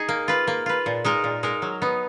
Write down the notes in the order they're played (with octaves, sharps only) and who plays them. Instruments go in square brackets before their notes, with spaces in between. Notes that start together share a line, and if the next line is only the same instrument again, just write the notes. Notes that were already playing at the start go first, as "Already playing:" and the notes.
Already playing: [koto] D#4 G#4
A#3
F4 B4
A#3
F4 B4
A#2
G#3 D#4 A#4
A#2
G#3 D#4 A#4
F#3
B3 D#4